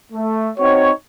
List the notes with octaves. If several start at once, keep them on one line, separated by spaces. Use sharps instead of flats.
A3
C4 D#4 F#4 C#5